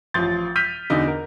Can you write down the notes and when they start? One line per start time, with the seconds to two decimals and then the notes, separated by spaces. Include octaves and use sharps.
0.14 A1 F3 C6 G6 A6
0.56 F6 G6 B6 D#7
0.90 E2 B2 D3 D#4
1.08 A#4